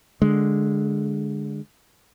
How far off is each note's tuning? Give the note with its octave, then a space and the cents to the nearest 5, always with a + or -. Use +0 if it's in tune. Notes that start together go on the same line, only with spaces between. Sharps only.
D3 +0 G#3 +0